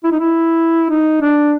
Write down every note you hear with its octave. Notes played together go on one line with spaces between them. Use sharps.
E4
D#4
E4
D#4
D4